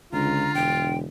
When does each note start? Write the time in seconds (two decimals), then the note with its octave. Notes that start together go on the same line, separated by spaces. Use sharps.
0.13 C#2 D3 F4 A#5
0.55 E1 G5